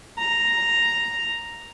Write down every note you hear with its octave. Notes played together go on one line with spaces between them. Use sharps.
A#5